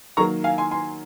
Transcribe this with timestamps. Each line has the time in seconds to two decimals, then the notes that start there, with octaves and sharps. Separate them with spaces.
0.17 D#3 F#3 A#3 A#5 C#6
0.44 F5 G#5
0.58 G#5 C6
0.71 G#5 C6